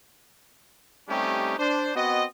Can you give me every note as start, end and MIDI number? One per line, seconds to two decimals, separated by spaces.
1.09 1.55 55
1.09 1.55 57
1.09 1.55 60
1.09 1.55 61
1.09 1.55 63
1.09 1.55 67
1.59 1.91 62
1.59 1.91 72
1.96 2.25 59
1.96 2.25 60
1.96 2.25 66
1.96 2.25 75